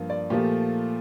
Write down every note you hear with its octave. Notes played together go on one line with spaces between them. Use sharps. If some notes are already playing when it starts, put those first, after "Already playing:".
Already playing: G2 F3 A#3
D5
A#2 F3 A3 G4